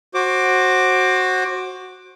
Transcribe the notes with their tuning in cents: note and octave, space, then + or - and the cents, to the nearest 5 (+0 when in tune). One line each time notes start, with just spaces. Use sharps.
F#4 +0 C5 +25 D6 +5